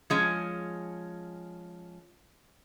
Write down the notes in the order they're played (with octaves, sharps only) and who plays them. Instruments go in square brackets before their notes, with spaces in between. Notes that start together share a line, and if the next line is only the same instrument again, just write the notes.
[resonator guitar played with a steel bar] F3 G#3 C#4